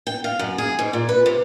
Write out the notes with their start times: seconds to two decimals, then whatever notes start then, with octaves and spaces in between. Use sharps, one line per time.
0.07 G5
0.24 F5
0.39 F#2
0.58 G#4
0.79 G#2
0.93 A#2
1.09 B4
1.26 C3